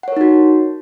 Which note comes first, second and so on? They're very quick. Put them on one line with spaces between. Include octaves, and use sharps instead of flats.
F#5 C#5 A#4 D#4 F#4